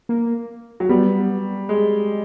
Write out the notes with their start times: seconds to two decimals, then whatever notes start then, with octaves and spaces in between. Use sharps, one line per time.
0.09 A#3
0.80 F#3
0.89 G3 B3
1.69 G#3